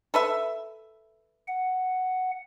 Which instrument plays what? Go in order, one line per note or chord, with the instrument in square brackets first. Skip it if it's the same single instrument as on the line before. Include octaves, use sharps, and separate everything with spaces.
[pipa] A4 B4 E5
[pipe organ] F#5